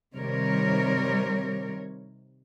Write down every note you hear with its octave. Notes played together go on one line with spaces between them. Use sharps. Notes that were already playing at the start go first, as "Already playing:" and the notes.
C3 D#3 G3 A#4 C#5